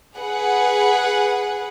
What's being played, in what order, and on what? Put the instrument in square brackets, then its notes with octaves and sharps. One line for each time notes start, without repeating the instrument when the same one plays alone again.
[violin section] G#4 B4 F#5